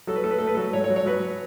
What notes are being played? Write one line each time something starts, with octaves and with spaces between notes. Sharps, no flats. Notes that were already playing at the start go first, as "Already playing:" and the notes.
F#3 A4
B4
A3 A4
B4
A4
A3
B4
F#3 A4
G#2 C#5
C#5
F#3
C#5
F#3 B4